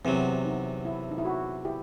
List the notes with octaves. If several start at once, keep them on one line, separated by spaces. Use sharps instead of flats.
E2 C3 F#3 C4
D#4
E4
D#4
E4
F#4
E4 G4